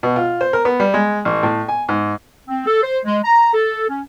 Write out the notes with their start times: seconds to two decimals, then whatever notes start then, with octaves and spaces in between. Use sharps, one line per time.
0.03 B2
0.16 F4
0.41 C5
0.53 A#4
0.65 B3
0.80 G3
0.94 G#3
1.25 A1
1.43 A2
1.68 G#5
1.89 G#2
2.48 C4
2.66 A4
2.82 C5
3.05 G#3
3.23 A#5
3.53 A4
3.88 C#4